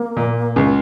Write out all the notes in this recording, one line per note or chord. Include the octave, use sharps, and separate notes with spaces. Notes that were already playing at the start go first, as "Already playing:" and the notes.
Already playing: A#3
A#2
C#2 C#3